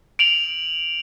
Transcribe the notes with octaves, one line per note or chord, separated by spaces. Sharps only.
D7 F7 F#7